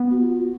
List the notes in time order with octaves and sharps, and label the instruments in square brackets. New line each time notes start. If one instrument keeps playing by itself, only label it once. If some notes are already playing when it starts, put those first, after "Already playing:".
Already playing: [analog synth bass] B3
[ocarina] F#4
F4
F#4